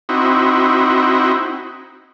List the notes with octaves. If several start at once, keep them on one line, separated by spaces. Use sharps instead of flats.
C4 D#4 E4 F#4